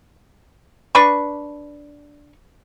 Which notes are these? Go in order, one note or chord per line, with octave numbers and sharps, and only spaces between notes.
D4 B4 C#6